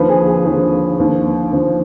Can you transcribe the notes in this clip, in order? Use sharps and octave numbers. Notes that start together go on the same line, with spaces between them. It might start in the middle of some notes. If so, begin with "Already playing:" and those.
Already playing: D#2 D3 F3 B4
G#4
G#4
D#2 D3 F3 G#4
D#2 D3 F3
D#2 D3 F3